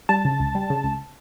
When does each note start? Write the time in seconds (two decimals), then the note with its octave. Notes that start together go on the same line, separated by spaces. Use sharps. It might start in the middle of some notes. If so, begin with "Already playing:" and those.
0.09 G3 A5
0.25 C#3
0.40 C#2
0.55 G3
0.70 C#3
0.84 C#2